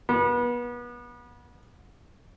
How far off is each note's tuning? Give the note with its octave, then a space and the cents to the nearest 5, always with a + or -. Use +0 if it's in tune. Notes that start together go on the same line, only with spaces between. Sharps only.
B3 -30